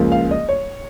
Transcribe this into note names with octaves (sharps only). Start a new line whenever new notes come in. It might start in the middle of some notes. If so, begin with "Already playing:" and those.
Already playing: C#2 C#3 F3 A#3
F5
D#5
C#5